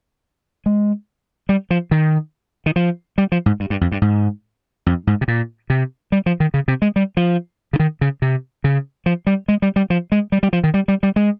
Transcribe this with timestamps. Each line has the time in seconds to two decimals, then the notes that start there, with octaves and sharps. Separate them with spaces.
0.66 G#3
1.49 G3
1.70 F3
1.91 D#3
2.66 D#3
2.76 F3
3.18 G3
3.32 F3
3.46 G#2
3.60 G2
3.70 G2
3.81 F2
3.92 G2
4.02 G#2
4.86 F2
5.07 G#2
5.21 C3
5.28 A#2
5.70 C3
6.12 G3
6.26 F3
6.40 D#3
6.54 C#3
6.68 C3
6.82 G#3
6.96 G3
7.17 F3
7.73 C#3
7.79 D#3
8.01 C#3
8.22 C3
8.64 C#3
9.06 F3
9.27 G3
9.48 G#3
9.62 G3
9.76 G3
9.90 F3
10.12 G#3
10.32 G3
10.43 G3
10.53 F3
10.64 D#3
10.74 G3
10.88 G3
11.03 G3
11.16 G#3